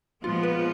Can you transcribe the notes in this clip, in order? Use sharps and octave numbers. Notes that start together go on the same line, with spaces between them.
A#2 F3 G#3 B3 F4
B4